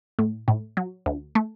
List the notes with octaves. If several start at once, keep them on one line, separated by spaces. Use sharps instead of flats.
A2
A2
F#3
D2
A3